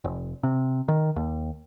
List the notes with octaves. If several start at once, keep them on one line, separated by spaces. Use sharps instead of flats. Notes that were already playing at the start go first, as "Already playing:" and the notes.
F1
C3
D#3
D#2